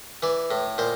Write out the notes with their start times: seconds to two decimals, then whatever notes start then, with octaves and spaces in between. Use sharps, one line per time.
0.23 E3 D5
0.51 A2
0.78 A#2 C5